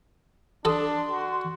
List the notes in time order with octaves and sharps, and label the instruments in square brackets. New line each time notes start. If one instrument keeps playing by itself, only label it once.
[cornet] D4 [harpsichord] A4 A5 D#6 [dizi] C6
[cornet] F#4